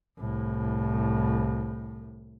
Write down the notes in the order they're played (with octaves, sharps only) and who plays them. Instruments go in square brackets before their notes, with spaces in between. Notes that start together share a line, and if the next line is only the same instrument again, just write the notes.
[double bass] C2 A2